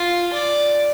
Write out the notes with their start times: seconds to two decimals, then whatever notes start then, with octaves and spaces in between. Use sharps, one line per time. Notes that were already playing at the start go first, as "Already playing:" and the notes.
Already playing: F4
0.33 D5